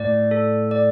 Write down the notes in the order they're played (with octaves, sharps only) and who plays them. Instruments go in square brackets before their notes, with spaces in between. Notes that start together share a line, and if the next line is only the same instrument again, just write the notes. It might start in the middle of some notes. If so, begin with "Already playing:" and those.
Already playing: [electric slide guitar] A2 [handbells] D5
[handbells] A4
D5